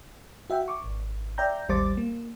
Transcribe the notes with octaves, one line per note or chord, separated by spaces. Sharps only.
F#4 E5 F#5 G5
C#6 D6
G#1
D5 E5 G5 A#5 G6
A1 D#2 G3 C5 D6 A6
A#3